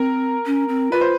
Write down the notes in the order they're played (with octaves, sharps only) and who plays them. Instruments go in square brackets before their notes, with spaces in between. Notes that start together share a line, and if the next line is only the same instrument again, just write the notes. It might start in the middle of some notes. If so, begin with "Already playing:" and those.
Already playing: [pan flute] C4 [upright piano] A#4
[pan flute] C#4
C4
[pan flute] F4 [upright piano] B4
[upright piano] C5